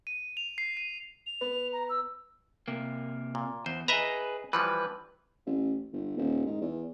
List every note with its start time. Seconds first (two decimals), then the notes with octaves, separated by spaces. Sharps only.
0.07 D#7
0.37 F7
0.58 C7
0.77 D#7
1.26 F7
1.41 B3
1.73 A#5
1.90 E6
2.68 C3 A#3
3.35 A#2
3.66 E2 C5
3.88 G#4 B4 D#5 E5 A#5
4.53 E3 F3 G3 B4
5.46 A1
5.92 G1
6.17 D#1
6.46 G#2
6.61 E2